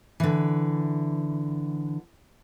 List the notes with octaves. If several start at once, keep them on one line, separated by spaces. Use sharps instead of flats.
D3 E3